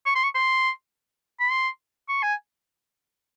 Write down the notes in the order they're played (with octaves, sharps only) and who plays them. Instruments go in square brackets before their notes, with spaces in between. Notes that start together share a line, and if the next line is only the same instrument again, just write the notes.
[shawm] C#6
C6
C#6
C6
B5
C6
C#6
G#5